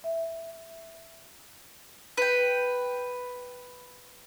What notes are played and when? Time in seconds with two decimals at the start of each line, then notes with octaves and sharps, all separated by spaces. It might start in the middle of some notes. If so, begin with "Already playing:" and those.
0.04 E5
2.17 B4 G5